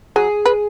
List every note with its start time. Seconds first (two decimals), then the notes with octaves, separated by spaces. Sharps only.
0.16 F#3 G#4
0.46 B4